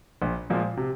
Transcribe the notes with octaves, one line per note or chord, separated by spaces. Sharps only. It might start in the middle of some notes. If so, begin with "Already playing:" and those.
A#1
A#2 F3 G#3
C3